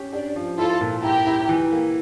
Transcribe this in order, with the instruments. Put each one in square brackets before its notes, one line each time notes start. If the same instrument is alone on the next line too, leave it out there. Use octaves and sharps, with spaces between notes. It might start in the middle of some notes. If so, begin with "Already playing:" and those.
Already playing: [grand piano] C#4 G4
[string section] D4 [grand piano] G4
[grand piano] F3
[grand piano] E4 [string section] F4 A4
[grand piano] A#2
[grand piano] E4 [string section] G4 A#4
[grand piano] E4
E3
A#3